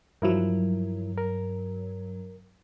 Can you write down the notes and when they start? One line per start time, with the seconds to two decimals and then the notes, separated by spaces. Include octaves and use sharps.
0.22 G2 F3 F#3 E4 A#4
1.18 A#4